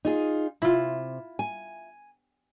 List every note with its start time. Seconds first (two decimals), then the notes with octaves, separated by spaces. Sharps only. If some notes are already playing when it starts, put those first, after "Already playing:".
0.05 D#4 F4 G#4
0.62 C3 E4 F4
1.39 G#5